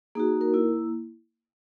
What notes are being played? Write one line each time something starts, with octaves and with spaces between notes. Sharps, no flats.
A#3 D#4 F#4 G#4
A#4
A#3 E4